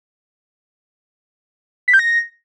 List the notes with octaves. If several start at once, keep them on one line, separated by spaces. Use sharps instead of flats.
B6
G6
A#6